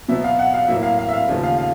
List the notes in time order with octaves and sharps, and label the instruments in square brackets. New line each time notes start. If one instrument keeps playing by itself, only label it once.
[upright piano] B2 F#3 B3 E5
F5
F#5
F5
A2 F#3 A#3 E5
F5
F5
E5
F5
D#2 C#3 F3 A3
F5
F5